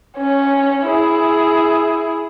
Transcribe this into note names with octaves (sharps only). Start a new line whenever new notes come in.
C#4 C#5
E4 G#4